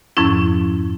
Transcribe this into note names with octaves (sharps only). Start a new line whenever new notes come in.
F2 G#2 F3 C#4 E4